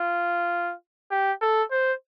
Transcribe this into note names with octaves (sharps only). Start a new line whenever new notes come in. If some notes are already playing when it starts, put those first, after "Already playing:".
Already playing: F4
G4
A4
C5